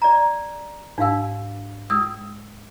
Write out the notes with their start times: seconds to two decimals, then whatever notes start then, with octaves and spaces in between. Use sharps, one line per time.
0.02 D5 A#5
0.98 G#2 D4 F5 E6
1.90 G#3 D#6 E6